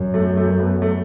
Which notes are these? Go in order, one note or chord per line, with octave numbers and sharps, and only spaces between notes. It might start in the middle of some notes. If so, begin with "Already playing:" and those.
Already playing: F#2
A3
A3
B3
A3